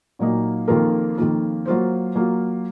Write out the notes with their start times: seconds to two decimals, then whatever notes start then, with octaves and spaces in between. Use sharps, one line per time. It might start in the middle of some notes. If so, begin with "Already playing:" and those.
0.19 A#2 F#3 A#3 D#4
0.68 F2 D#3 A#3 F4 A#4
1.17 F2 D#3 A#3 F4
1.65 F#3 A#3 F4 C5
2.15 F#3 A#3 F4